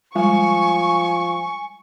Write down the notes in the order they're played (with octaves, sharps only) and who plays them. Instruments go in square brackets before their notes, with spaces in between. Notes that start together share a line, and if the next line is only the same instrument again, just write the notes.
[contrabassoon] F3 [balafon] G3 G#3 [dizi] G#5 [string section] C#6